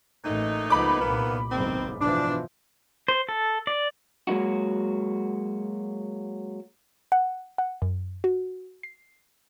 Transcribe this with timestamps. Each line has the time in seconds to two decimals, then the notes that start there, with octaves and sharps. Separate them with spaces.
0.24 A1 A#2 A3 D#4
0.70 C#2 F3 B3 B5 D6
1.00 C2 A#2 D#3 A#3 B3
1.51 F#1 B1 G#2 D#3 C4
2.00 B2 E3 F3 D4
3.08 C5
3.29 A4
3.67 D5
4.27 F#3 G#3 A#3 D#4 F#4
7.12 F#5
7.58 F#5
7.82 F#2
8.24 F#4
8.83 C7